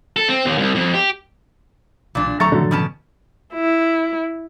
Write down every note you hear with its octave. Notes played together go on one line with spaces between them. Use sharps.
A4
C4
D#2
C2
F2
G4
B1 A#2 E3 D4
D2 F#3 A3 A4 A#5 C#6 A6
A2 D3 D#3 F3 F#3
B2 C#4 A5
E4